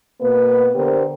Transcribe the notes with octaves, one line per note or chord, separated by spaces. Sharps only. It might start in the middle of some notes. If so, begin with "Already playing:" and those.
B2 A#3 B3 B4
D3 B3 G4 A#4 C5